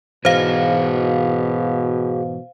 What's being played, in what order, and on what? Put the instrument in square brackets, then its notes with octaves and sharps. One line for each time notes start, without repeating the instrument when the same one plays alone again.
[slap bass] G#2 E3 [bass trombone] B2 [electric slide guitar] F#4 G#4 D#5 [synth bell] C5 F5